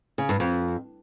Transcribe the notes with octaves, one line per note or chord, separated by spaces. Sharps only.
C#3
G2
F2